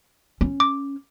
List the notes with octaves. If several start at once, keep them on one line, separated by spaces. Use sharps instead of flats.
C#4
D6